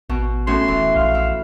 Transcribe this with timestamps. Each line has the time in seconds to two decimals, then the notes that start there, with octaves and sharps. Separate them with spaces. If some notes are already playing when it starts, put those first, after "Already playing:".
0.09 A1 B2
0.47 A2 C#4 F#4 C6
0.68 D#1 E3
0.96 A#1 F5
1.15 E4